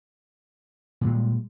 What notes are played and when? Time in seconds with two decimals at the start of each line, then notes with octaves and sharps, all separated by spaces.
1.01 A#2
1.04 G3
1.07 G#3